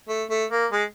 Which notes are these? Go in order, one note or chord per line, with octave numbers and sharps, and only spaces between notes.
A3
A3
A#3
G#3